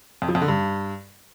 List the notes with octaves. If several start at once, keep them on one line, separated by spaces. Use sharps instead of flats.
F2
F3
F2
D3
G2